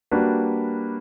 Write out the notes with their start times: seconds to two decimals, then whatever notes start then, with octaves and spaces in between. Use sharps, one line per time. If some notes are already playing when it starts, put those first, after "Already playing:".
0.11 G3 A#3 D4 F#4 B4